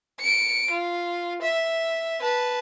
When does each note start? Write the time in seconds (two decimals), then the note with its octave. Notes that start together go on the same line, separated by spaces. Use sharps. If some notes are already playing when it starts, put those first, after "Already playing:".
0.20 C#7 D7
0.70 F4
1.42 E5
2.21 B4 A5